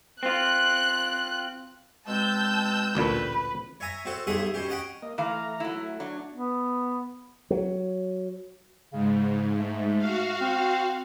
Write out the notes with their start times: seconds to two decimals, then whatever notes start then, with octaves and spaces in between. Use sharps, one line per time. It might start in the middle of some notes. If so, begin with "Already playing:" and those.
0.23 C4 F4 F#6
2.08 B2 G#3 C4 A5 E6 G6
2.95 A1 D2 A#2 B4
3.80 C#5 E5 G#5 A#5
4.05 C4 F#4 A4 C#5
4.27 B1 G2 G#4 E5 F#5 D#6
4.54 B2 C#4 G4
4.68 C#4 D#5 F#5 G5
5.02 A#3 D#5
5.18 E3 A3 F5 A#5
5.60 F#3 E4
5.75 A3
6.00 F#3 D4
6.32 B3
7.51 F#3
8.93 G#2 C#3
9.59 A3
9.98 F#4 F5
10.41 C4